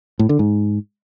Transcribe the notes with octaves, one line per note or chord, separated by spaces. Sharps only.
A2
D3
G#2